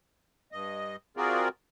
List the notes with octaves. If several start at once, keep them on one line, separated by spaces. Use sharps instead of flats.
G2 D#5
C4 F4 F#4 G#4 A#4 D5